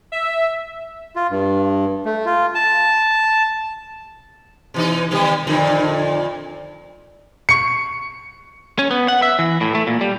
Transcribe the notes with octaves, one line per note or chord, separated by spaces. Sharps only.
E5
F4
G2
A3
F4
A5
B2 E3 D#4
B2 D#3 G3
F2 A#2 D3
C#6 C#7
C#4
B3
F#5
E5
E3
A2
A3
A#2
G3